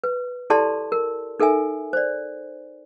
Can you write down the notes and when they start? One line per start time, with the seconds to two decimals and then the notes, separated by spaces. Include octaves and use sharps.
0.04 B4
0.50 E4 G4 A4 D5 A5 C6
0.92 A#4
1.40 D#4 A4 A#4 E5 G#5
1.93 C5 D5